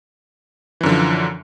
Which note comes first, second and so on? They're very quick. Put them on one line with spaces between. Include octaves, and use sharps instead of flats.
E3 F#2 D3 F3